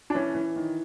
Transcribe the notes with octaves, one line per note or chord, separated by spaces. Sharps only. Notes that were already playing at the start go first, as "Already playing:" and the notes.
D4
E3 C#4
E3
D#3